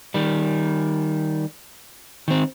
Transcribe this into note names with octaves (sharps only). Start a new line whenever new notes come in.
D#3 G3
D#3 C4